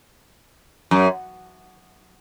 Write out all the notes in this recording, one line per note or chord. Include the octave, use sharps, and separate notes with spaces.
F#2